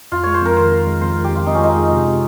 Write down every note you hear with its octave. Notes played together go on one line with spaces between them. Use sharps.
F2 F4
G#3 C#5
C5
F2 A#4
D#3 C5
D#3
G#3
F2 C5
D#3
G4
F2 F4
F2 D#4
C#4
G#3 D#4
G#3
C3
C3